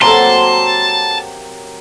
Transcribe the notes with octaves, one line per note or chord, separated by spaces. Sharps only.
C3 F#3 A#3 A4 A5 A#5 C6